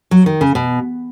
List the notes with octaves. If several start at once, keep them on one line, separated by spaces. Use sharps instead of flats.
F#3
D#3
C#3
B2